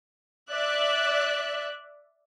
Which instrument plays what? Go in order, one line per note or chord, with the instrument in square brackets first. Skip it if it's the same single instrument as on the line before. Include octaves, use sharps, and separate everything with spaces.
[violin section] D5 E5 F#6